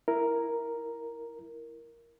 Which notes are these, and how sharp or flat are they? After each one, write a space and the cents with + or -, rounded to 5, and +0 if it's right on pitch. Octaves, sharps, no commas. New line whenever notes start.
E4 +5 A#4 +0